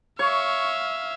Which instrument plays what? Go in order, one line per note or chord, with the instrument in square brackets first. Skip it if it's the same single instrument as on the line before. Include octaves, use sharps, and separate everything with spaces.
[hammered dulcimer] C#5 [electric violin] E5 F5 [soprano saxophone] C#6